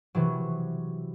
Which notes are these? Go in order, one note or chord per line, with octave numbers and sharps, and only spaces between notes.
C3 E3 F#3